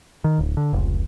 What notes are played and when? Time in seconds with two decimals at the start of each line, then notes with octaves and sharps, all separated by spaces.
0.24 D#3
0.39 D1
0.57 D3
0.73 F1 C#2